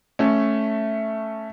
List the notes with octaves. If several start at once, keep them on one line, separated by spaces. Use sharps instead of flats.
A3 C#4